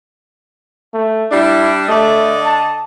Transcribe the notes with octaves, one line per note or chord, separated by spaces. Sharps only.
A3
G3 D4 E4
D3 A3 D5 D#5
A5